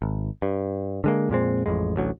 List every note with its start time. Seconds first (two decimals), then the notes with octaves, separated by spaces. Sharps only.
0.02 G#1
0.42 G2
1.04 D3 G#3 A#3
1.30 F2 A#2 G#3 C4
1.66 A1 F2 G#3
1.96 A1 D2 F#3